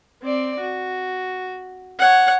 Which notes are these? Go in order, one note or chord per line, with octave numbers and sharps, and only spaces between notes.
C4 D5
F#4
C#5 F#5